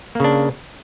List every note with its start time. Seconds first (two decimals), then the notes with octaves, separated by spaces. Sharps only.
0.15 A#3
0.20 C#3
0.24 D4